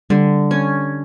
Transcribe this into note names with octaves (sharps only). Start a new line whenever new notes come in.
D3 G3
C#4